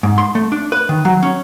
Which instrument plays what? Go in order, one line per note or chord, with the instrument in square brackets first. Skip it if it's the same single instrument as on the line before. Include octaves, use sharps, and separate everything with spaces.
[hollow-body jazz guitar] G#2
C6
A3
D4
B4
D#3
F#3
C#4